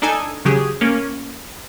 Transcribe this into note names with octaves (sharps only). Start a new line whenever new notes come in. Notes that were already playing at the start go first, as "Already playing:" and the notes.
D4 D#4 A4 G#5
C#3 F#3 G4 G#4
A#3 C#4